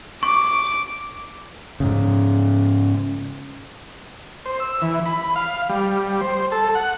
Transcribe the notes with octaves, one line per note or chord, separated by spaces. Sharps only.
C#6 D6
G#2 C#3
C5
E6
E3
B5
F5
G3
C5
A4
F#5